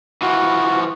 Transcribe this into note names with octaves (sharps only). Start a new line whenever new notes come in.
E3 F3 F#4